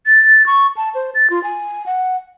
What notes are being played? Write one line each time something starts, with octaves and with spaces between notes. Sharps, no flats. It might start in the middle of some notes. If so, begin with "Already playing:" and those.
A6
C#6
A5
C5
A6
F4
G#5
F#5